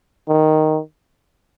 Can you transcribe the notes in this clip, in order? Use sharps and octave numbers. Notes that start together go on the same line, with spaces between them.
D#3